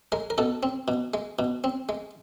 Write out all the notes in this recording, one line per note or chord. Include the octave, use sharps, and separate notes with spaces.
G#3 A#4
A#4
B2 A4
C4
B2
G#3
B2
C4
G#3